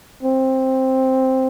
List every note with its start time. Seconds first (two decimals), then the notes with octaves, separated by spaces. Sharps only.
0.23 C4